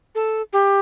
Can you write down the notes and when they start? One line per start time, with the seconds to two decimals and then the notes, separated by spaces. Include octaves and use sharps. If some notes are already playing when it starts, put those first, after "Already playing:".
0.15 A4
0.53 G4